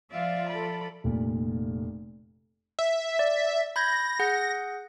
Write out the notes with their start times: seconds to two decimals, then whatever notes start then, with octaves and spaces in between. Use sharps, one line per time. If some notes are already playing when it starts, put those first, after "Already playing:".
0.11 F3 F4 D5 E5 F5
0.49 A4 B5
1.04 F1 A#2
2.79 E5
3.19 D5
3.76 B5 G6 G#6 A#6
4.19 G#4 F#5 G6